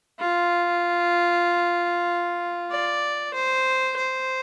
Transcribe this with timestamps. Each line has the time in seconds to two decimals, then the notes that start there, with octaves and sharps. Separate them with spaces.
0.20 F4
2.71 D5
3.34 C5
3.96 C5